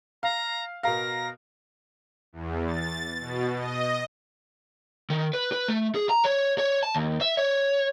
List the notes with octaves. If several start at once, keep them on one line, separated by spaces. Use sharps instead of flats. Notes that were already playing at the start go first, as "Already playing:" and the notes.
F5 A#5
B2 A#4 F5 A#6
E2
A6
B2
D#5
D#3
B4
B4
A3
G#4
A#5
C#5
C#5
A5
D#2
E5
C#5